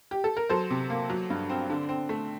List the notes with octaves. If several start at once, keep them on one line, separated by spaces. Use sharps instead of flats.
G4
A4
A#4
F#3 A4 C5
C3
A#3
F#3
G2
C4
D3
C4
A3